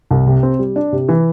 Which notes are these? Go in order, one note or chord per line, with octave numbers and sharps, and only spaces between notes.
C2
C3
C4
G3
D4
C3
E3